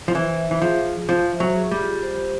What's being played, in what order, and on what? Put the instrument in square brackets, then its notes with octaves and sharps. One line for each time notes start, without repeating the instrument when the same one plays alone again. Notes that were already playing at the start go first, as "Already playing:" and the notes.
[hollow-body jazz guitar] F3
[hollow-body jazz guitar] E3 [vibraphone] C5
[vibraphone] E5
[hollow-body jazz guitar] E3
[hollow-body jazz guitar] F3 [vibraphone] G#4
[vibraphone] F4
[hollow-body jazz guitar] F3 [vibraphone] C5
[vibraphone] E5
[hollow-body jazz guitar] F#3
[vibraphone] G#4
[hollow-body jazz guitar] G3
[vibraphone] F4
C5